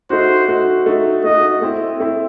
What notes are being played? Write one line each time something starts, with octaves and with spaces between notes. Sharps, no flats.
A3 D#4 F#4 C5
A3 D#4 F#4
A3 D#4 F#4
A3 D#4 F#4 D#5
A3 C4 E4
A3 C4 E4